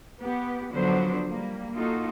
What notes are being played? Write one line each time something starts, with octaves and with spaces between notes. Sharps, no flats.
B3 G4
D3 F3 F#3 B3 D4 C5
G3 A#3
A#3 D#4 F4 F#4 A4